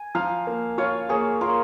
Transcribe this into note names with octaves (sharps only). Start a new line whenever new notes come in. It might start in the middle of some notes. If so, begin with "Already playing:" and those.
Already playing: G#5
F3 F5 A#5
A#3
F4 C#5 F5
A#3 G#4 C#5
A#3 F4 A#4